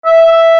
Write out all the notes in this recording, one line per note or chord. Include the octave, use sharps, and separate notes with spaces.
E5